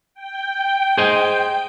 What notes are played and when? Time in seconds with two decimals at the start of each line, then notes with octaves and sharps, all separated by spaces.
0.14 G5
0.98 G#4 C5 D#5